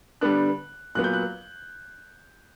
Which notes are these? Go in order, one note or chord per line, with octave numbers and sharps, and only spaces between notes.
D3 G3 B3 D4 F#6
A#2 F#3 B3 F#6
G6
F#6